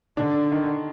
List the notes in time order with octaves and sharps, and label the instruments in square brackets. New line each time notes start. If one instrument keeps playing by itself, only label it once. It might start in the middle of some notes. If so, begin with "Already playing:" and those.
[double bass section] D3 [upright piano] D4
[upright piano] D#3